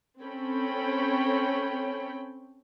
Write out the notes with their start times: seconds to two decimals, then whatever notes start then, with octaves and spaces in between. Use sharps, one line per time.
0.21 C4 C#4 A4 C#5 G5 B5